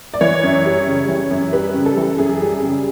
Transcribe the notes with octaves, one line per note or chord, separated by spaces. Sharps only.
D5
E3 C#5
F#2
G3
C#3
E3
F#2
G3 B4
C#3
A4
E3
F#2 G#4
G3
C#3